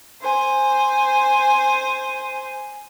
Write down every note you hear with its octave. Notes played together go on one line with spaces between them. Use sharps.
C5 G#5